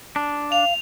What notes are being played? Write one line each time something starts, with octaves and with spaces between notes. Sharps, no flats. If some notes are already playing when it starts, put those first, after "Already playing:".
D4
F5 F7